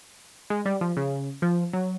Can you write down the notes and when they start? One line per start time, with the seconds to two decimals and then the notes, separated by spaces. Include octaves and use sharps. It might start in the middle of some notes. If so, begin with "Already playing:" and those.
0.50 G#3
0.66 G3
0.81 F3
0.97 C#3
1.42 F3
1.73 F#3